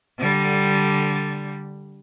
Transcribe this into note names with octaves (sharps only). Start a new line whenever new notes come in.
D3 G3